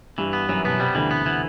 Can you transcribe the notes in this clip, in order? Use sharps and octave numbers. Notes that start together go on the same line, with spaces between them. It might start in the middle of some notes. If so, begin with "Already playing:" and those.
G2 E3 G3
B3
F#2 E3 F#3
B2 B3
C3 G3
D2 D3 E3
B3
E3